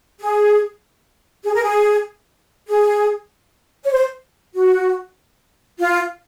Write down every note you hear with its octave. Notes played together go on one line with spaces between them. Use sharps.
G#4
G#4
A#4
G#4
G#4
C#5
C5
F#4
F4